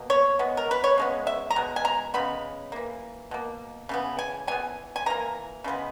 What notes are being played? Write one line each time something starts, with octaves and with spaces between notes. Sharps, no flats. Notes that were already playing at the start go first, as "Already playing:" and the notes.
Already playing: B2 A#3
C#5
E3 G#3 B3
A#4
B4
C#5
C#3 G#3 B3
E5
A#5
B2 G#3
G#5
A#5
C#3 G#3 B3 B5
E3 A#3
B2 A#3
C#3 E3 B3
G#5
E3 B3 G#5
G#5
E3 A#3 A#5
C#3 E3 G#3 B3